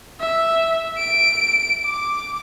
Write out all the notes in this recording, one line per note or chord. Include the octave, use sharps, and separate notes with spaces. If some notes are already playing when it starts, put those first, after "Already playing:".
E5
D7
D6